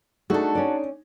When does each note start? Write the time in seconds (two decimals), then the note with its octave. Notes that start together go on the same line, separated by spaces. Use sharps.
0.30 A3 D4 D#4 F#4 G#4 A4
0.55 C#4 D5